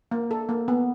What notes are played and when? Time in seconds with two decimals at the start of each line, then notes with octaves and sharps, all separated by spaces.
0.11 A#3
0.31 A4
0.49 A#3
0.68 B3